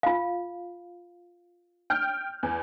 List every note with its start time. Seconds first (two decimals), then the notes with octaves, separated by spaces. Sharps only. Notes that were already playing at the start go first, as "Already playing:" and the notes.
0.03 F4 F5
1.90 G5 F6 G6
2.43 E2